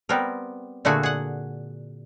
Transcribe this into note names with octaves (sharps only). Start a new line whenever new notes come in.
G3 B3 C4 A#4
A#2 D3 A3 F#4 G#4
G#4 F#5